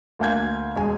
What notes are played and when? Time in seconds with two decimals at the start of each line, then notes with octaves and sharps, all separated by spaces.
0.19 D2 A#3 F5 G#5 G6 G#6
0.76 E1 G#3 G#5